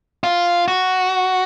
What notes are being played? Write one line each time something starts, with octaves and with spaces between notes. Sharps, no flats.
F4
F#4